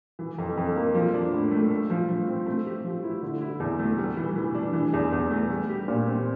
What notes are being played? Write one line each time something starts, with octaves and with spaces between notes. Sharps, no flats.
E3
F2
F2
A#3
F3
D4
A2
A3
A3
F3
F3
C4
A3
G4
F3
E4
D3
E4
E2
A3
G3
E3
E3
D4
E3
E2
E2
A3
G3
G4
A#2
C4